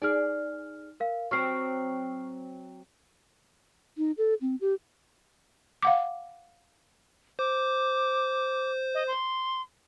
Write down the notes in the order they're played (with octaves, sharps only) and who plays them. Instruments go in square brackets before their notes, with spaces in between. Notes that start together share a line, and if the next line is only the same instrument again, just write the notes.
[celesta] D#4 F6 [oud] G#4 D5
[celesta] A#4 F5
[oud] F#3 C4 [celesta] C#6 F6 C7
[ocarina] D#4
A4
C4
G4
[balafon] F5 F#5 D6
[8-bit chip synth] C5 [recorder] D6
[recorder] D#5
C6